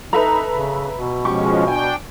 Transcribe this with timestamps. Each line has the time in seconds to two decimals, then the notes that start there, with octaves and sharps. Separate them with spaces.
0.13 D#4 A4 B4 E5 A#5
0.52 C#3
0.94 B2
1.25 F3 G#3 C#4 G4 C#6
1.68 D4 G5 G#5